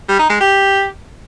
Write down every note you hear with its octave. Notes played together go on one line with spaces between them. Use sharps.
G3
D#4
G#3
G4